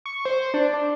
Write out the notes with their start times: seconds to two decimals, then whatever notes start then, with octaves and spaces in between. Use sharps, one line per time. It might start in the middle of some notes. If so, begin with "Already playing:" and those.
0.06 C#6
0.25 C5
0.54 D4
0.73 D4